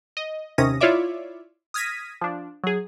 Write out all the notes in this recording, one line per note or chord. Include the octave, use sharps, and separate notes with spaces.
D#5
D#2 C3 C#4 D#6 A#6
E4 F4 C#5 D5 E5 D6
D#6 F6 G#6 A#6 B6 D#7
F3 D4
F#3 G#4